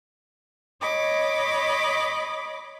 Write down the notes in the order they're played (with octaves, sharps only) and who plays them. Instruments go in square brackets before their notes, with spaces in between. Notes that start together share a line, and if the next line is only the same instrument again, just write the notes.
[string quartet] C#5 D#5 B5 D6